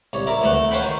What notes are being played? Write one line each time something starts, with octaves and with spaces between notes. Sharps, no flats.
C2 C#5
E4 A#4 D5
D2 E3 A3 F#5
A3
C#4 F4 C5 F#5 G5 B5
D#3